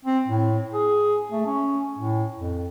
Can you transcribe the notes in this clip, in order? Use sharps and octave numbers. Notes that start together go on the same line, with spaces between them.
C4
A2
G#4
A3
C#4
A2
F2